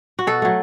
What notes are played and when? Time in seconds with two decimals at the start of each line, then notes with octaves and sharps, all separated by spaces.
0.19 F#4
0.27 B2 A4
0.42 F#3 A3